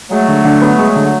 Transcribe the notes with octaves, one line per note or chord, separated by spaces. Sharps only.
F#3 G#3 A3
D3
D3
B3
G#3
D3